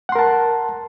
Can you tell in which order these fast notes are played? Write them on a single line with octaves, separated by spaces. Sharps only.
F#5 C6 A#4 A5